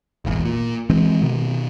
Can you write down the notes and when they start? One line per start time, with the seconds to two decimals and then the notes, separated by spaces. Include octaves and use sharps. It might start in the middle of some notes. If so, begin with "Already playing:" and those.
0.25 D#1 G#1 E2
0.45 A#2
0.90 E3 G#3 C4
1.22 B2 D#3